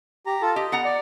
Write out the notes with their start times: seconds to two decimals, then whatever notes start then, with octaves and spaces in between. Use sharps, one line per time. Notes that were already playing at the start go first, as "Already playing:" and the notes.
0.26 G4 A#5
0.42 F4 A4 A5
0.56 G4 D#5
0.72 B3 F#5 A#5
0.84 D5